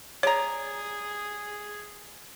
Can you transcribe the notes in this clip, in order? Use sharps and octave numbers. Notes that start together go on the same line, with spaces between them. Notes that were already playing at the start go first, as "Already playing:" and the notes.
G#4 C#5 D5 A#5